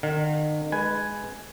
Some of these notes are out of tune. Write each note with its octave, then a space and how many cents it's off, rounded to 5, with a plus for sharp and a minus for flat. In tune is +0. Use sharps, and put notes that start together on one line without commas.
D#3 -40 F5 +35
G#3 +5 B4 +5 G#5 +5